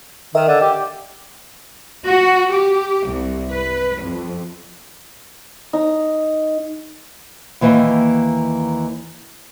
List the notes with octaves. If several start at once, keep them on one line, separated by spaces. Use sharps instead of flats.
D#3 A#4 D#5 E5
D3
G4
F#4
G4
C2
B4
F2
D#4
D#2 E3 A#3 C#5 D#5 G5